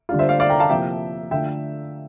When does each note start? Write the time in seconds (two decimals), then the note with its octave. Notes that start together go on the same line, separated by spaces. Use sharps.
0.09 D3 G3 D4 F4
0.19 C5 E5
0.29 D5 F5
0.40 D5 F5
0.50 G5 A#5
0.59 F5 A5
0.70 C3 F3 A#3 E4 E5 G5
1.31 D3 A3 D4 F4 E5 G5